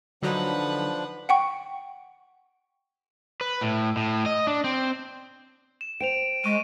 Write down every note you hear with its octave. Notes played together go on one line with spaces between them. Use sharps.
D3 F3 F#3 D4 D#4 B4 F#5
F#5 G5 C#6
B4
A2
A2
D#5
D4
C4
E7
C5 G5 D7 F7
G#3 C#6 D#7